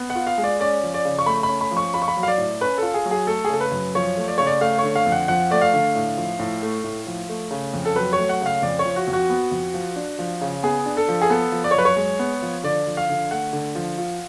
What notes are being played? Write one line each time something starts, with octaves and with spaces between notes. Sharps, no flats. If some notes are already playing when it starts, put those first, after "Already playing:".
Already playing: B3
F#5
F4
F5
G#3
D5
C#4 D5
F3
D5
C#3
C#6
A3 B5
B5
C#4
B5
F3
C#6
F4 B5
C#6
B5
F#3
F5
D5
A2
C#4 B4
F4 A4
G#4
F#3
G#4
A3 A4
G#4
C#3 A4
B4
F#2
F3 C#5
A3
D5
C#3 C#5
D5
A3 F5
C#5
D3
F5
F2
F#5
F3 F#5
A3 D5
F5
D3
A2
F3
A2
A3
A2
F3
A3
C#3
F2
A4
F#3 B4
C#5
A3
F#5
C#3 F5
F2 D5
C#5
F3
F#4
F2
F#4
B3
F2
F3
D4
F3
C#3
B3 G#4
D4
A4
F3
G#4
B3 A4
F3
D5
C#5
F#2 B4
C#5
G#3
B3
F3
D3 D5
F3
F5
D3
A3 F#5
D3
F3
F4